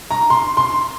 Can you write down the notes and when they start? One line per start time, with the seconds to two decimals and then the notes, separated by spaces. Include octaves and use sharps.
0.11 A#5
0.30 C6
0.57 C6